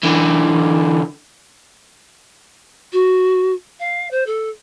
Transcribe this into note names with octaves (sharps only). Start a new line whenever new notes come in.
D3 E3
F#4
F5
C5
A4